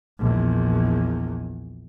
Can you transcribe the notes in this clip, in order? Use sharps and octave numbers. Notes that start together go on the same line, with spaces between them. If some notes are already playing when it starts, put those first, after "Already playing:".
A#1 E2